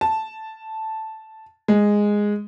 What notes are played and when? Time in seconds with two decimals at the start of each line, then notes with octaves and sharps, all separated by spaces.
0.01 A5
1.68 G#3